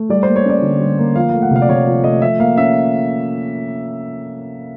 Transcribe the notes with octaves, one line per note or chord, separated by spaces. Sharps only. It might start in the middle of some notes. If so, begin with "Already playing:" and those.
Already playing: A3
G3 D5
A#3 C5
C#5
C#4 D5
D3
G3
A#3
F3 F5
A3 F5
F#5
C3 F5
D5
C3 C#5
F3
A3 D#5
F3 E5
A#3 F5
C#4 E5